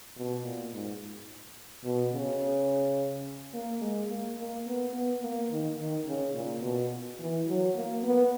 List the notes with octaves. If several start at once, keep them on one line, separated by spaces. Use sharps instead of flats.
B2
A#2
G#2
B2
C#3
A#3
G#3
A#3
A#3
B3
B3
A#3
D#3
D#3
C#3
A#2
B2
E3
F#3
A#3
B3